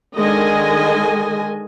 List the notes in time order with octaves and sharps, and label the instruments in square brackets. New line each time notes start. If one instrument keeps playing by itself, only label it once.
[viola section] D3 D#3 G#3 D#5 G#5